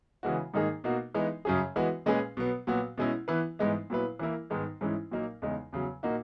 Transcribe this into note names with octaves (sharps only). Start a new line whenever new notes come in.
C#3 E3 G#3 B3 F#4
G#2 D#3 A#3 D#4 G#4
B2 A#3 D#4 F#4
E3 G#3 B3 D#4
F#2 C#3 F#3 C#4 G#4
E3 G#3 B3 F#4 B4
A#2 G#3 C#4 G#4 B4
B2 F#3 B3
A#2 F#3 B3 F#4
B2 G#3 C#4 E4
E3 B3 E4 B4
G#2 E3 G#3 B3 D#4
A#2 F#3 B3 E4 B4
E3 A#3 E4 A#4
G#2 D#3 G#3 B3
G#2 E3 G#3 C#4 E4
A#2 F#3 A#3 D#4 A#4
E2 C#3 G#3 D#4
E2 C#3 F#3
A#2 A#3 D#4 F#4